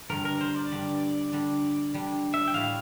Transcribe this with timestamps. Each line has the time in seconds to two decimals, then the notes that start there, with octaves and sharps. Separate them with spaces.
0.09 G2 D3 G3 A#4
0.25 A#4
0.41 C5
0.56 D5
0.71 G2 D3 G3
1.32 D3 G3 D4
1.94 D3 G3 D4
2.34 E5
2.48 G5
2.54 A2 G3 C4 E4 F5